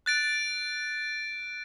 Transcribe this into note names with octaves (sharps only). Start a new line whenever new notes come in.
F#6 A6 D7